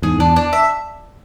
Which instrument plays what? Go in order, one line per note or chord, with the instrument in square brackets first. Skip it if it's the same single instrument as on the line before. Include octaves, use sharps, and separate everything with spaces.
[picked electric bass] E2 G#2 [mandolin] G#4
[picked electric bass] E2 [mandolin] D4
[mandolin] D4
E5